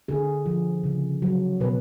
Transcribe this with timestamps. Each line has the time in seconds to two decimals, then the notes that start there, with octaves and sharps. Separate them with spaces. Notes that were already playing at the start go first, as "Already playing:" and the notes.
0.08 D3 G#4
0.46 F3
0.84 C#3
1.22 F#3
1.60 B2 B4